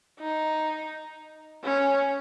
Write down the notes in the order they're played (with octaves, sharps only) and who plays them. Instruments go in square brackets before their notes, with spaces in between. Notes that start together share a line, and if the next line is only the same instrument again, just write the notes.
[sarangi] D#4
C#4